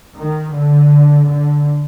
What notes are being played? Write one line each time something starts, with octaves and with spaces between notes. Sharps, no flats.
D#3
D3
D3